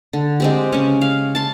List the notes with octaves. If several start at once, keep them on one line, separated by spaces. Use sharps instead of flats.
D3
G#3 C4 G4
C#3 C#4
F5
A5 C6